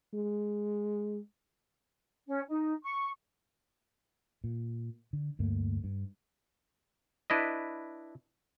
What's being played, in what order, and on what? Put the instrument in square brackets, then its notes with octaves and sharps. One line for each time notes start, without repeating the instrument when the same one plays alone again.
[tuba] G#3
[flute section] C#4
D#4
C#6
[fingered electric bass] A#2
D3
D2 G2 A3 A#3
G2
[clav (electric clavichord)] D4 E4 B4 D#5